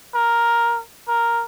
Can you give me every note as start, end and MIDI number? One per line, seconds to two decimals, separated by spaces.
0.14 0.81 70
1.08 1.44 70